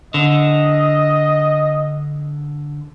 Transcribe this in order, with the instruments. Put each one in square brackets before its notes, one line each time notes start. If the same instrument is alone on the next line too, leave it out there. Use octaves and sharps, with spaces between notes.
[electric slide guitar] D3 [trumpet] D#5